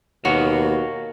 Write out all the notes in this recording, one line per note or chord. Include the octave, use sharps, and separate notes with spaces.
D#2 B2 F#4 A#4 C#5 F5